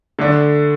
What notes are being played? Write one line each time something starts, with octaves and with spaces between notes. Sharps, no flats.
D3 A3 D4